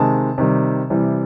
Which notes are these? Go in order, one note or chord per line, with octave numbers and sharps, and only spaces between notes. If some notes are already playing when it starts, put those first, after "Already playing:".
Already playing: C3 D#3 G#3 A5
C3 D#3 G3
C3 E3 G3